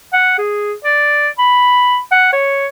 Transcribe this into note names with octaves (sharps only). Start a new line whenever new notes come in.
F#5
G#4
D5
B5
F#5
C#5